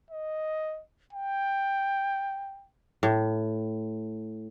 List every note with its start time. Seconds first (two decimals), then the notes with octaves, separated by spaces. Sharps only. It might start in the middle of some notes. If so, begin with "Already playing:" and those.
0.10 D#5
1.13 G5
3.03 A2